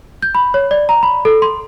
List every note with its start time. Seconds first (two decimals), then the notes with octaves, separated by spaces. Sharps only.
0.23 G6
0.35 B5
0.54 C#5
0.71 D5
0.89 A#5
1.03 B5
1.25 A4
1.42 C6